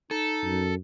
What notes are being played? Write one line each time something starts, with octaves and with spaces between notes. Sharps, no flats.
D#4 A4
F#2